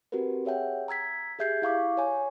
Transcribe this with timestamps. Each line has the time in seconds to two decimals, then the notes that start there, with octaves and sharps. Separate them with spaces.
0.12 C4 F#4 G4 A#4 B4
0.45 G#4 C#5 E5 F#5 G5
0.88 A#5 E6 G#6 B6
1.39 G4 G#4 E5 G6 G#6 C7
1.62 E4 F5 C#6 D6
1.97 C#5 G#5 C#6